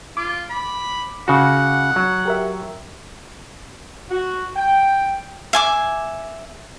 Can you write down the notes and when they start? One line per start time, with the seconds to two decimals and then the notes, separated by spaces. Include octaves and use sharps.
0.17 F4 D6
0.50 B5
1.28 C#3 F#4 F#5
1.96 F#3
2.25 G4 A#4 E5
4.10 F#4
4.56 G5
5.53 E5 G#5 D6